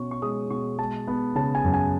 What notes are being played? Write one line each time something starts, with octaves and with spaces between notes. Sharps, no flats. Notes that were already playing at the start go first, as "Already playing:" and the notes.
Already playing: B2 C#4 C#6
C#6
G#3 D#6
B2 C#6
G#3 A5
B3
C#3 A5
G#5
F#2
G#5